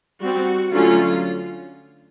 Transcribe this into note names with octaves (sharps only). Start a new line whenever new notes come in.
G3 C4 F#4
D3 F#3 A3 C#4 F4